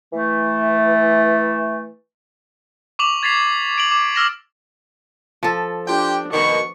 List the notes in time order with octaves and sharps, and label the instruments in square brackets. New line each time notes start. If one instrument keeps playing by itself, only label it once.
[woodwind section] E3 A3
[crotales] C#6 D6 F7 F#7
G#6 A6 B6 C7 F7
D7 F7 F#7
D6
E6 F6 A#6 E7
[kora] F3 A4
[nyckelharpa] D4 [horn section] F4 G4 G5
[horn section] B2 D#3 [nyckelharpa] C#6